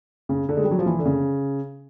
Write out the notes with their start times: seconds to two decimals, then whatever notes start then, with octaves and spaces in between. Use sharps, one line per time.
0.29 C#3
0.49 D3
0.57 G#3
0.64 G3
0.71 F#3
0.79 F3
0.86 E3
0.99 D3
1.05 C#3